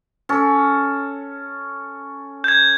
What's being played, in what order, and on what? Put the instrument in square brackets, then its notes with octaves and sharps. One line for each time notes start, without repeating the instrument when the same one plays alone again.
[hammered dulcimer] C#4 A4
[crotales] G6 G#6